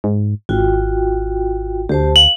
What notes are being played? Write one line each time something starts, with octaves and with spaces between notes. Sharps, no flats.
G#2
G#1 F4 F#4 G5
D2 G4 C5 A5
F5 F#7